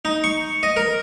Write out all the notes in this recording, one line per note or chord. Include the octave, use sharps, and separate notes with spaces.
D#4
C#6
D#5
A#4